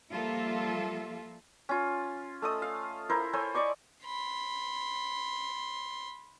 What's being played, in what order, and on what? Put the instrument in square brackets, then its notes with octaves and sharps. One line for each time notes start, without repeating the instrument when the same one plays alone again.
[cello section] F3 G3 A#3 F4 A4 E5
[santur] C#4 F4
A3 A4 D#5 D#6
F5
E4 A#4 C5
A4 C5 C#5 G#5
D5 D#5 C#6 D6
[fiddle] B5 C6